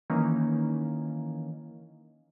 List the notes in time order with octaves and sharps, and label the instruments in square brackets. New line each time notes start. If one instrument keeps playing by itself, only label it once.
[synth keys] D#3 E3 A#3 C#4 D#4